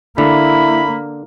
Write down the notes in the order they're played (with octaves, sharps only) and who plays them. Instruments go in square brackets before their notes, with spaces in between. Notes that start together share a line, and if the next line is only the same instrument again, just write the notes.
[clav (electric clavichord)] D3 [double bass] A#3 [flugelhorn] E4 [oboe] B5